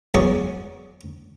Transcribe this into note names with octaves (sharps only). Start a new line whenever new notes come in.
E2 F#3 D5 G#5 C#6 D#6